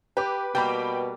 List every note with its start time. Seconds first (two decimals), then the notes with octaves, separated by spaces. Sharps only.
0.17 G4 B4 D6
0.55 B2 G3 A#3 G5 B5